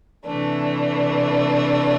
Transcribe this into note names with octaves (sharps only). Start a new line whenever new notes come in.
C3 E3 A3 D4